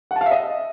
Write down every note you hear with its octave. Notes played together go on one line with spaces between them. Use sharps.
F#5
A5
F5
E5
D#5